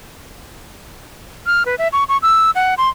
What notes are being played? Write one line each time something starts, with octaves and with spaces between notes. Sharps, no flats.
F6
B4
E5
C#6
C#6
E6
F#5
C6